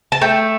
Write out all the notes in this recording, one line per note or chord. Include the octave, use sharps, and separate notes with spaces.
A5
A3 G5